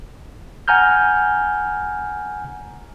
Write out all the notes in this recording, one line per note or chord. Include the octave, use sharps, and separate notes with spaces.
F#5 G#5 A#5 F6 G6